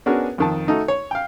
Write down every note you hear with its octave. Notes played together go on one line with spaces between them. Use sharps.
B3 C#4 D4 F#4 G#4 A#4
F2 D#3 A5
A3 D#4 F#4 A4
C#5
F5 G5